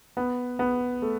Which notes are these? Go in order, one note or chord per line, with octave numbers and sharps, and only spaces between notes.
B3
B3
A3